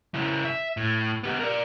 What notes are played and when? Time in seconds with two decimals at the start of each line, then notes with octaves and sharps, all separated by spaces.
0.14 C#3 E4
0.45 E5
0.77 A2
1.23 B3 G4
1.40 A#4 D5